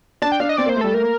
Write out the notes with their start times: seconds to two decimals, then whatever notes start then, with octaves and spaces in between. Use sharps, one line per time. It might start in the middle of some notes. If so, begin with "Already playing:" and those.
0.22 D4 A5
0.32 G5
0.40 D4 F5
0.49 D#5
0.57 C4 D5
0.66 A#3
0.69 C5
0.76 A3
0.81 G3 A4
0.94 A3 A#4
1.03 A#3